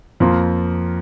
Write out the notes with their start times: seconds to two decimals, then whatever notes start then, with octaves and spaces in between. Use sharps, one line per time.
0.20 F2 F3 A#3 F4